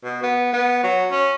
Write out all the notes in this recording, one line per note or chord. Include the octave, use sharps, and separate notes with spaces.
B2
B3
B3
F#3
C#4